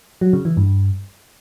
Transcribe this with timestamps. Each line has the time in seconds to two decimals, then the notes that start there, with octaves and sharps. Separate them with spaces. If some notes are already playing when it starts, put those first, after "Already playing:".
0.21 F#3
0.33 C#3
0.45 E3
0.57 G2